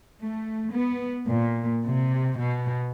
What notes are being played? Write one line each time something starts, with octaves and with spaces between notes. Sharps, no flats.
A3
B3
A#2
C3
B2